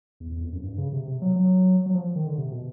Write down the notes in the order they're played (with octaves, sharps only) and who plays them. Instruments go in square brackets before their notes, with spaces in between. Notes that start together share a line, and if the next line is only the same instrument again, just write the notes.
[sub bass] E2
E2
F2
F#2
G2
C#3
C3
C3
F#3
F#3
F#3
F3
D#3
D3
C3
B2